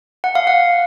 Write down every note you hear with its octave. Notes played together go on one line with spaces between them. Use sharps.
F#5
F5
F#5